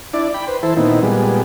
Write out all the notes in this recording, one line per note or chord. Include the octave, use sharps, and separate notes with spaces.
D4 E4 D5
G5 B5
B4 C5
E3 E4 A4 C5
A#2 D#3 B3 C4 D#4 E4
A#2 G3 G#3 B3